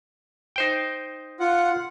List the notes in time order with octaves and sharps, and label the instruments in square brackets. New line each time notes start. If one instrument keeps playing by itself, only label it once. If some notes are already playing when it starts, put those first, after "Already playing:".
[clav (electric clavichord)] D#4 C5 G5
[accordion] F4 F#5